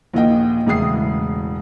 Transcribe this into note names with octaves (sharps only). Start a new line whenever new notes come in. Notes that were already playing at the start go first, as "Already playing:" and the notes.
A#1 D#2 D#5 G5
E1 A2 C#3 E3 D#6 C7